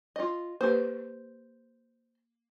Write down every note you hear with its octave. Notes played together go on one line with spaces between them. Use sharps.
F4 D#5
A#3 G4 B4 C5